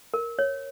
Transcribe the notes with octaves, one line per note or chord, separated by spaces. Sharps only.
A#4
C#5